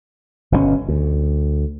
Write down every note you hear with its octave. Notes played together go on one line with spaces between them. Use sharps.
G1 B2 D3 C#4
D2